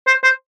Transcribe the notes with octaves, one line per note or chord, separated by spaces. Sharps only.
C5
C5